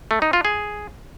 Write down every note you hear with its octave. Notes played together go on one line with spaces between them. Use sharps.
A3
D#4
F4
G#4